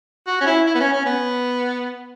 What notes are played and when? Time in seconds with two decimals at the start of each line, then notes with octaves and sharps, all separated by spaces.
0.27 F#4
0.41 C#4
0.46 E4
0.67 E4
0.75 B3
0.80 C#4
0.93 C#4
1.06 B3